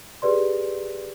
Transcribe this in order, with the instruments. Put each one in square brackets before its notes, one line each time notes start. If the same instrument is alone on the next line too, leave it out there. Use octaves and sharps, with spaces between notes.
[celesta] G4 G#4 B4 D5 C6